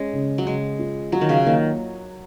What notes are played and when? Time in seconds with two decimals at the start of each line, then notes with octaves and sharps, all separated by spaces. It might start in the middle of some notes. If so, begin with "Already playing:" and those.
Already playing: G#3 C#4
0.13 C#3
0.38 F#3
0.46 C#3 G#3
0.79 F4
1.12 F#3 F4
1.21 D#3
1.29 C#3
1.46 D#3 A#3